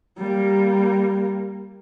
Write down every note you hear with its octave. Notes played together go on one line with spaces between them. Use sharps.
G3 A#3